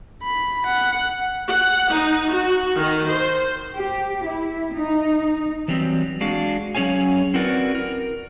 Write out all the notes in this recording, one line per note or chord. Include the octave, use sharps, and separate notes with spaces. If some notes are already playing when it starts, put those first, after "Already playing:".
B5
F#5
F#5
D#4
F#4
D#3
C5
G4
E4
D#4
E3 F#3 G3 C4
G#3 D4 F#4 G#4 F5
F#3 C#4 G#4 C#5 F5 G#5
C4 E4 F#4 A#4 B4 D5
A#4